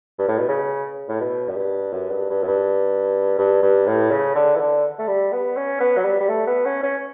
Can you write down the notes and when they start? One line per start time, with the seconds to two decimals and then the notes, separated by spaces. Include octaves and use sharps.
0.18 G2
0.28 A2
0.38 B2
0.48 C#3
1.08 A2
1.21 B2
1.48 F#2
1.56 G2
1.93 F#2
2.11 G2
2.30 G2
2.43 F#2
2.47 G2
3.38 G2
3.62 G2
3.86 A2
4.11 C#3
4.35 D3
4.56 E3
4.59 D3
4.99 A3
5.07 G3
5.32 B3
5.56 C#4
5.80 B3
5.97 F#3
6.05 G3
6.20 G3
6.28 A3
6.47 B3
6.65 C#4
6.83 C#4